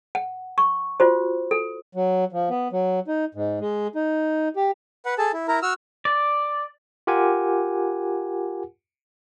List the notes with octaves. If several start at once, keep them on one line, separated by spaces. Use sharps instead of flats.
F#5
C#6
F4 F#4 C5
A4
F#3
F3
B3
F#3
D#4
G#2
G#3
D#4
G4
B4 F#5
G#4 A4 A5
E4
E4 A#4 A#5
F#4 E6 F6
D5
F4 G4 A#4 F#5 G#5